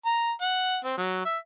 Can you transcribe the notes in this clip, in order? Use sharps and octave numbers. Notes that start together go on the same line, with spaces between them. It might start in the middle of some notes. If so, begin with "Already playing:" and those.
A#5
F#5
C4
F#3
E5